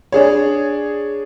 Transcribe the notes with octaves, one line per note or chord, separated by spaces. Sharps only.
D4 G#4 C#5